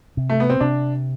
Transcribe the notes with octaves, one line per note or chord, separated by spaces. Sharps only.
C3
A3
B3
C4
C3 D4